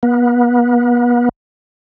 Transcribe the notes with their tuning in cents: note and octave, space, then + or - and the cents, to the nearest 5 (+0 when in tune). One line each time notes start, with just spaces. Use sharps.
B3 -35